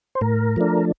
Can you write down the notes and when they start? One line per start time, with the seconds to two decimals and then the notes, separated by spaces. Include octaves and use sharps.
0.15 C5
0.21 A2 A#4
0.56 F3 A3 D4